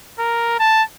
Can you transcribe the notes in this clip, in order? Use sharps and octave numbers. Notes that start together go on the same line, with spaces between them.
A#4
A5